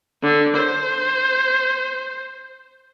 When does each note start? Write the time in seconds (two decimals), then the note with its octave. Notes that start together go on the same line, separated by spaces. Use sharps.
0.23 D3
0.56 C5